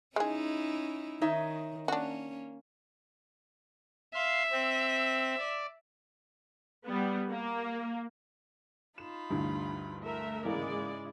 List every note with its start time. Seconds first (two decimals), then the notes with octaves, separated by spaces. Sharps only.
0.16 G#3 C#4 D#4 E4 G#4
1.21 D#3 D#4 C#5 E5
1.88 A#3 C#4 D4 F#4
4.15 E5 F5 C6
4.51 C4
5.38 D5
6.85 G3 B3
7.29 A#3
8.98 D#4 F4 B5 E7
9.30 D2 G2 E3
10.02 A3 A#4 E5
10.45 G#2 C#3 E3 G#3 A#3 E4 D5